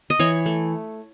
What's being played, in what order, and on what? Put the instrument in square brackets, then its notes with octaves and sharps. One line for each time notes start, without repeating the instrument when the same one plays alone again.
[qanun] D#5
E3 C#5
A3